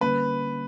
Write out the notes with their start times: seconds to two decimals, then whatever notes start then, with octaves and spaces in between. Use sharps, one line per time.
0.01 D3 G3 A#3 C#4 B4